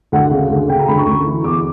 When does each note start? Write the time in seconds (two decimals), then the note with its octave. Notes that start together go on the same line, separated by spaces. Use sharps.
0.12 D2 F#5
0.31 C#3
0.50 D2
0.69 C#3 G5
0.79 A#5
0.88 D2 B5
0.97 C#6
1.07 D2
1.25 E3
1.44 E2 D6